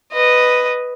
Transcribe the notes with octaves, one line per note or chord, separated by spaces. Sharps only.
B4 D#5